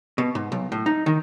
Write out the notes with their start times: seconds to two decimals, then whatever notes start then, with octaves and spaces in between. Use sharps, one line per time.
0.18 B2
0.35 G#2
0.52 B1
0.72 A2
0.86 D#4
1.06 D#3